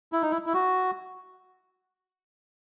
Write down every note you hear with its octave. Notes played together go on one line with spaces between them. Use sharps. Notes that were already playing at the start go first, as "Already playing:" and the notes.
E4
D#4
E4
E4
F#4